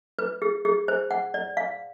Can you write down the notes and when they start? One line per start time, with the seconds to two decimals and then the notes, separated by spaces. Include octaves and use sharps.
0.19 B4
0.42 G#4
0.65 G#4
0.88 C5
1.11 F#5
1.34 D5
1.57 F5